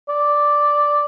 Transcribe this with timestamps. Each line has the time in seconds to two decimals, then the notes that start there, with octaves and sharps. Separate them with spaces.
0.09 D5